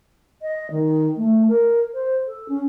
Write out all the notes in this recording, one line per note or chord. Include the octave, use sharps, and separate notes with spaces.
D#5
D#3
A3
A#4
C5
A4
C#4